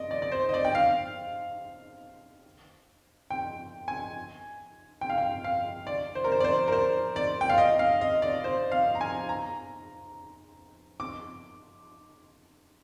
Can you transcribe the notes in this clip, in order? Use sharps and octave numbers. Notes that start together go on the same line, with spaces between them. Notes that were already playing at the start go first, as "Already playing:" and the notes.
Already playing: D5 D#5
D5
D5
C5
D#5
D5
G5
F5
G5
G#5
G5
F5
G5
F5
D5
C5
A#4
C5
D5
C5
A#4
C5
D5
G5
F5
D#5
F5
D#5
D5
C5
F5
A#5
G#5
A#5
D6